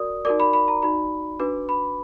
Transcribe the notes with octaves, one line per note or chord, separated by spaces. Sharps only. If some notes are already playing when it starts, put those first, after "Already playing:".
Already playing: F#4 A#4 D5 D#6
D#4 F#4 A#4 D5 D6
B5
B5
A#5
D#4 F#4 D5 B5
D4 F#4 B4 D6
B5